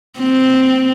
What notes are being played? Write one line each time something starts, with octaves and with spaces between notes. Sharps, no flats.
C4